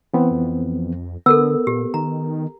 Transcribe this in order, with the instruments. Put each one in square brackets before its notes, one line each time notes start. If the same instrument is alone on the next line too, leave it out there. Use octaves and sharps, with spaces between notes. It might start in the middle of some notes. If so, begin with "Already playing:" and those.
[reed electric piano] E3 B3 C4
[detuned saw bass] F2
[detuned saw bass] D3 [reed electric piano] B3 [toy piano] A4 A#4 E6
[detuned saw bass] A#2 [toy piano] G4
[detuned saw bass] D#3 [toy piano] A#5